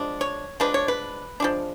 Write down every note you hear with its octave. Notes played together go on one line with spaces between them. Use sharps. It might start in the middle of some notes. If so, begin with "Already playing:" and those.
Already playing: F3 G#3 D4
C#5
F3 G#3 D4 B4
C#5
B4
F3 G#3 D4